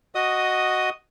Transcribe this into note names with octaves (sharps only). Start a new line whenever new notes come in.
F#4 D#5 D#6